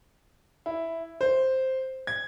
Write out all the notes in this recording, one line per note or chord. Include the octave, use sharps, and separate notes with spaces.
E4
C5
G#6